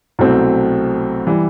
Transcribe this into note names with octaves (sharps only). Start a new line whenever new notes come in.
C2 B2 F#3 A3 C4
E3 G3